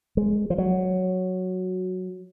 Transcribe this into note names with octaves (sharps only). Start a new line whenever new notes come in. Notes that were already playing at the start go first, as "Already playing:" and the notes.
G#3
F3
F#3